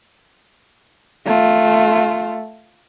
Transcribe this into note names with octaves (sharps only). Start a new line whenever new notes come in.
A3 F4